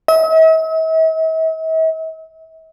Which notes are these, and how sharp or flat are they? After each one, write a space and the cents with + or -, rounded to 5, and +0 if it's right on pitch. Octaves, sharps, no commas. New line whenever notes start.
E5 -45